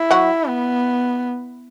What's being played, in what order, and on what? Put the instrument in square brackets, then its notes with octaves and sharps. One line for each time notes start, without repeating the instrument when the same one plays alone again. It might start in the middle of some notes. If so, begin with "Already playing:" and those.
Already playing: [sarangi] E4
[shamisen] F#3 F#4
[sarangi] B3